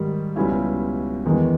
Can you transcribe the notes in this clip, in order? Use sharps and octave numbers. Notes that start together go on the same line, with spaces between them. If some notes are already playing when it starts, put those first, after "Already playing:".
Already playing: G#2 D#3 G3
C#2 B2 G3 C#4 E4
E2 D#3 G#3 B3